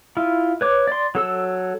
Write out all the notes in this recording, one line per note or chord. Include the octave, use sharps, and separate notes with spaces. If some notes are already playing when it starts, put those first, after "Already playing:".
E4 F4
B4 C#5 D6
D5 C6
F#3 A4 E6